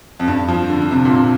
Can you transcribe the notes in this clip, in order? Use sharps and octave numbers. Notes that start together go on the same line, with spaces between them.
F2
G2
F3
D3
D3
C3
A#2
C3